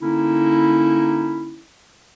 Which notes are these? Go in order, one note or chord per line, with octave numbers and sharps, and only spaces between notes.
D3 A#3 C#4 D#4 E4